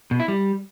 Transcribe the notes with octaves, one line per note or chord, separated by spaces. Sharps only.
B2
E4
G3